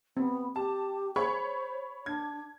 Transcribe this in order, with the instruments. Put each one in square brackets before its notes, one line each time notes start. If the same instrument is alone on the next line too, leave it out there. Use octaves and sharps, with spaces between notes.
[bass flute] B3 [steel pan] C4
[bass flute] G4 [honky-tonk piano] A5
[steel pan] G#4 [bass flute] C5 [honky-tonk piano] C#5 B5 C#6
[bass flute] D4 [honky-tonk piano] G#6